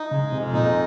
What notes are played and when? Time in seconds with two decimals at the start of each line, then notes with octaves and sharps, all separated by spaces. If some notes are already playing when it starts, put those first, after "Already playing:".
Already playing: D#4
0.11 C#3 G#3
0.33 F2 C3
0.53 A#2 D#4